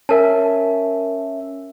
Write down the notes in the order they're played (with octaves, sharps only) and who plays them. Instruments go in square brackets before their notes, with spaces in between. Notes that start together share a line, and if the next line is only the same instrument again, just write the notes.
[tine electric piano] C#4 E5 [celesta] A#4 A5